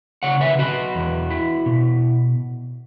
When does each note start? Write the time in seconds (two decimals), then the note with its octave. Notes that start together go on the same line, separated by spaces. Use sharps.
0.23 C#3 C#5 F#5
0.41 B4 E5
0.59 F#3 F#4 B4
0.95 E2
1.30 E4
1.66 B2